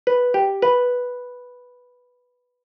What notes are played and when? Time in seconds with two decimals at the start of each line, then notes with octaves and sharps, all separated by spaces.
0.07 B4
0.34 G4
0.62 B4